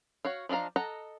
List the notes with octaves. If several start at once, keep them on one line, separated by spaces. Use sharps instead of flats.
F#4 C#5 F5
F3 D4 D#5 F5 A#5
A4 D#5 F#5 A#5